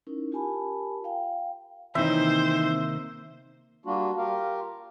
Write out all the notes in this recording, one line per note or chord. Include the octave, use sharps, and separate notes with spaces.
C#4 D#4 E4 A#4
F4 G4 A#4 G#5 A5 B5
F5 G5
C3 D#3 E3 A#3 C4 D#4 C5 E5
G3 A#3 D4 F4 F#4
F4 G4 A#4 F5